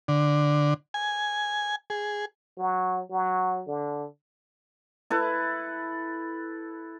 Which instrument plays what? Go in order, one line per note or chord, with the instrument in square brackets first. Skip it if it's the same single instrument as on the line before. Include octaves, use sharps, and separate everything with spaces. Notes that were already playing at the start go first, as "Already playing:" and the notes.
[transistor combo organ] D3
G#5
G#4
[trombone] F#3
F#3
D3
[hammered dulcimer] E4 A4 B4